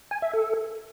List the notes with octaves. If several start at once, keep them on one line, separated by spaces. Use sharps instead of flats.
G#5
E5
A4